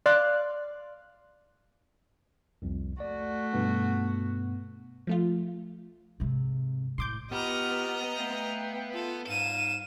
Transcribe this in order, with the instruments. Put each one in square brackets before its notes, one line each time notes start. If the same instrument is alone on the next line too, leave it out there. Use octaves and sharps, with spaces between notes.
[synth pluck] D5 F5 C6 F#6
[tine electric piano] C2 F2
[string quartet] A3 F#4 [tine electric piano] D5
[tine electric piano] G2 B2 B3
[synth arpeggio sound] F3 A3 F4
[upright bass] G#2 C3
[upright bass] A2 [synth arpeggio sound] C6 D6 G6
[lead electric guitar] B3 B4 [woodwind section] F4 F6 [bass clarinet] G4 [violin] D#5 A#5
[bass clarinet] A3 [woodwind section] E5 F5 G5
[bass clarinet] F4 [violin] A4
[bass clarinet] G#2 [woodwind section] G3 D#4 F5 [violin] D#7 E7